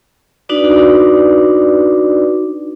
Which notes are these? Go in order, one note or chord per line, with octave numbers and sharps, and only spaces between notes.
D4 D#4 F#4 B4 D5 D6